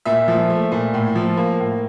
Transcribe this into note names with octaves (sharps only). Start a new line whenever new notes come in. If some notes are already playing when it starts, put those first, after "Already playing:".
A#2 E5
F3
A3
A#2
A2
F3
A#3
A2